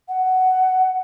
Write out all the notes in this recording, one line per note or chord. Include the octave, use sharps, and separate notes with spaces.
F#5